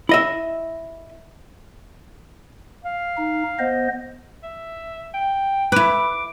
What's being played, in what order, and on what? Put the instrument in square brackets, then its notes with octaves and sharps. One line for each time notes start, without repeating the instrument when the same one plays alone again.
[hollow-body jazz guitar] E4 D#5 E5
[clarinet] F5
[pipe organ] D#4
B3 C5 D#5
[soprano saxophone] E5
G5
[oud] E4 B4 [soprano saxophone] D6